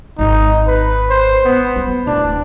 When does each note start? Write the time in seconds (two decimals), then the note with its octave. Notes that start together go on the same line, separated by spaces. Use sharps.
0.19 G#1 D#4
0.67 B4
1.10 C5
1.45 B3
1.76 F#3
2.07 D1 D4